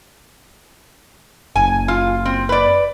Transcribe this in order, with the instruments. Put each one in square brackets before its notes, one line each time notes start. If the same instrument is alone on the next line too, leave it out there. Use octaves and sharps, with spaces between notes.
[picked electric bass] F#1 [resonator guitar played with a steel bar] G#5
[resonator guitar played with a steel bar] F4
C4
B4 D5